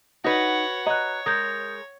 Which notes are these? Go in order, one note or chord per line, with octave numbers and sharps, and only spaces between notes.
D#4 F#4 B4 C#5 F#5
C#5 D#5 A#5 F#6
G#3 A#4 D#6 G6